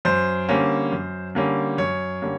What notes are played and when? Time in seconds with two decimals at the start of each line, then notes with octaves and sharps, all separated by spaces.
0.05 F#2 C5
0.49 D3 G3 A#3 C#4
0.92 F#2
1.35 D3 G3 A#3 C#4
1.78 F#2 C#5
2.22 D3 G3 A#3 C#4